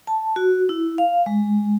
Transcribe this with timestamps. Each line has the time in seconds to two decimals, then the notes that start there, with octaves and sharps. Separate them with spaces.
0.07 A5
0.36 F#4
0.69 E4
0.98 F5
1.26 G#3